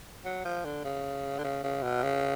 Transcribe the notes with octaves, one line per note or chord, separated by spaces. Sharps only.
F#3
F3
D3
C#3
D3
C#3
C#3
B2
C#3